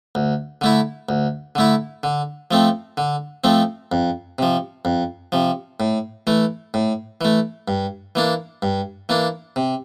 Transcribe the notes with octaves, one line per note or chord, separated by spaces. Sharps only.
D2
D3 A3 E4
D2
D3 A3 E4
D3
F3 A3 C4
D3
F3 A3 C4
F2
C3 F3
F2
C3 F3
A2
E3 A3
A2
E3 A3
G2
E3 A#3 D4
G2
E3 A#3 D4
C3